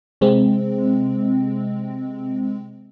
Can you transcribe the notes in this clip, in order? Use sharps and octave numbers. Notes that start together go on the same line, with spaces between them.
C3 G#3 C4